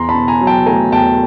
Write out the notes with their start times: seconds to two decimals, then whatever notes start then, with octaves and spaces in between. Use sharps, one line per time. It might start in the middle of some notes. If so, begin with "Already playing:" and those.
Already playing: E2 A#5 C6
0.09 A5 B5
0.15 B2
0.28 G#5 A#5
0.41 F#3
0.47 G5 A5
0.66 A3 G#5 A#5
0.92 E2 G5 A5